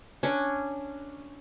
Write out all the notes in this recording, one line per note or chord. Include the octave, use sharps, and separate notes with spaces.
C#4 D4